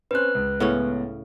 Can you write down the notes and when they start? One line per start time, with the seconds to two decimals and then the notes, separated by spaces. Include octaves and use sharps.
0.11 C4 C#4 B4 C5 F#6
0.35 C#2
0.60 A2 C#3 B3 C#4